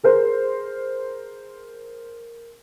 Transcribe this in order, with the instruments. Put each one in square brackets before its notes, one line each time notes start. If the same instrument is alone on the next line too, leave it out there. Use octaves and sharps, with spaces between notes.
[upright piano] G#4 A#4 C5